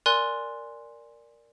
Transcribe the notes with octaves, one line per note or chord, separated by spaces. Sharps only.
A#4 D5 G#5 C6 F#6